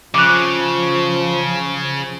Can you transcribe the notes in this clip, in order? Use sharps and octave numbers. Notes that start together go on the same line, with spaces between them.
C#3 F3 D6 F#6